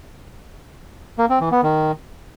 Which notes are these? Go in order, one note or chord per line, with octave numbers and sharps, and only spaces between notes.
A#3
C4
E3
B3
D#3